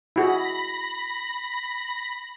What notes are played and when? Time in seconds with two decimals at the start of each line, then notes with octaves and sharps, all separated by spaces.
0.16 E4 F#4 G#4 B5 A#6